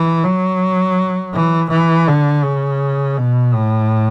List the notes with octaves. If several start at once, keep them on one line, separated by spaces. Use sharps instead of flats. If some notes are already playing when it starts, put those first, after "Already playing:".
Already playing: E3
F#3
E3
E3
D3
C#3
B2
A2